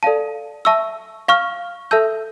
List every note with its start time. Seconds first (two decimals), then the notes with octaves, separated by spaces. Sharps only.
0.03 A4 D5 F5 A5
0.65 E5 A5 C#6 E6
1.28 F5 C#6 F6
1.91 A4 E5 A5 E6 G6